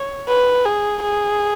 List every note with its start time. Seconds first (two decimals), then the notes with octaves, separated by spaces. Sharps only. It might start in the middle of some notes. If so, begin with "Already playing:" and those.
Already playing: C#5
0.28 B4
0.65 G#4
1.03 G#4